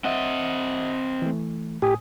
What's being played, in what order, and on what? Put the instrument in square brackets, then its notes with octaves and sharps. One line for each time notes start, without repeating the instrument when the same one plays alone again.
[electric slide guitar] C4 D#5 [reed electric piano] E5 F#5
[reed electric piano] E3 A3
[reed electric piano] A2 G#5 D#6 [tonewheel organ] G4